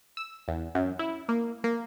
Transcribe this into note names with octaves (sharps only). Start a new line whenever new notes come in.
E6
E2
F#2
E4
A#3
A#3